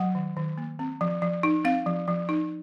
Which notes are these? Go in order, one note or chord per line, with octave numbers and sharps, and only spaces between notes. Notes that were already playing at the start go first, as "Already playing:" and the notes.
Already playing: F#3 F#5
D#3
D#3
A#3
C4
F3
F3
D#4
C4 F5
F3
F3
D#4